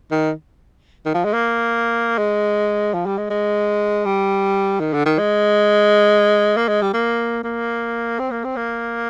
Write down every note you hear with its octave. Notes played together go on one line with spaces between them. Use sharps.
D#3
D#3
F3
G#3
A#3
G#3
F3
G3
G#3
G#3
G3
D#3
D3
D#3
G#3
A#3
G#3
G3
A#3
A#3
C4
A#3
C4
A#3